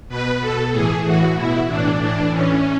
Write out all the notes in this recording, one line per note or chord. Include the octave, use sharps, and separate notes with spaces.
B2 B4
B2 A4
A2 E3 G#4
A2 E3 F#4
B2 E4
A2 E3 D4
A2 E3 D4
A2 E3 C#4